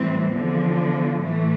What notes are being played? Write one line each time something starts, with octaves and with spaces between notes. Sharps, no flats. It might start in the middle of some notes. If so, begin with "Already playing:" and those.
Already playing: A2 E3 G3 C4
E2 D3 F3
A2 E3 A3